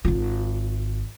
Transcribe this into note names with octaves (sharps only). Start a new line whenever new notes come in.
G#1 F4